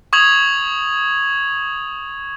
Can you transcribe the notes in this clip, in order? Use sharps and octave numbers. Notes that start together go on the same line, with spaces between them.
C#6 D#6 G#6 F7 F#7